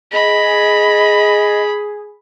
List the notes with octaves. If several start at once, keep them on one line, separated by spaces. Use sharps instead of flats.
G#4 D#5 B5